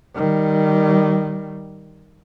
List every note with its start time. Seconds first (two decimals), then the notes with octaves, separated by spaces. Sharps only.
0.15 D#3 G3